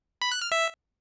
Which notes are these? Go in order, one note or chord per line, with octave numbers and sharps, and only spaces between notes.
B5
F#6
F6
E5